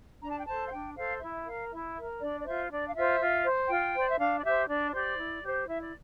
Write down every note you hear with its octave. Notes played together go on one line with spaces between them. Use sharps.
D4 A#5
A5
G5
A4 C5 A5
F5
D4 G5
A4 C5 F5
E4 E5
A#4 F5
E4 E5
A#4
D4 D5
D5
F4 C5 E5
D4 D5
F5
F4 C5 E5
F4
C5
F4 G5
C5 D5
E5
D4 F5
D5
G4 C5 E5
D4 D5
G4 C5 D5
E4
G4 C5
E4 E5
D5